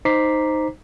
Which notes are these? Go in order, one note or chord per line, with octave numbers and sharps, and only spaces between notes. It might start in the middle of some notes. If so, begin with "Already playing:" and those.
D#4 C5 A#5 D6 B6 C7